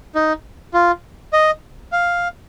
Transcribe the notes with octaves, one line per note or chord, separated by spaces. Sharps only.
D#4
F4
D#5
F5